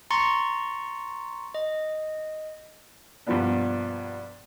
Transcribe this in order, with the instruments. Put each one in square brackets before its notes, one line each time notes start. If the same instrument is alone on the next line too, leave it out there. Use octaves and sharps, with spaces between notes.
[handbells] A#5 C6 C#6 A6 C#7
D#5
[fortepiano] G2 B2 F3 A#3 B3 D4